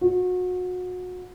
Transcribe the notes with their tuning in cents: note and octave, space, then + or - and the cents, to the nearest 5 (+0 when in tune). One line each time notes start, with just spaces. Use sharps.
F#4 -30